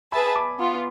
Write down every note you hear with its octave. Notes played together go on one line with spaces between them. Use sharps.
G#4 B4 E5 G#5 A5 B5
B5 D6
B3 F4